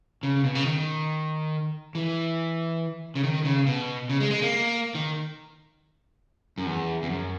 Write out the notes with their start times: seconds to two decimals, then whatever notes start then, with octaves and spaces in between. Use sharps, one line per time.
0.23 C#3
0.44 B2
0.55 C#3
0.65 D#3
1.95 E3
3.15 C#3
3.24 D#3
3.45 C#3
3.67 B2
4.09 C#3
4.20 G#3
4.31 G#3
4.42 A#3
4.95 D#3
6.58 F#2
6.66 E2
7.03 E2
7.10 F#2